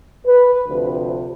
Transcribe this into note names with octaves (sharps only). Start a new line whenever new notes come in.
B4
D2 C3 F3